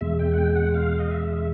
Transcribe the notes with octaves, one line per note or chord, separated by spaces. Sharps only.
E2 B2 G#3 E5
G5
F#5
G5
F#5
F5
D#5
E5
E5